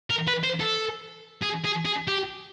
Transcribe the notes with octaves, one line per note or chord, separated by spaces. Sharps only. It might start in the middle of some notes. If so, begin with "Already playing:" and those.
A#4
B4
C5
A4
G#4
G#4
G#4
G4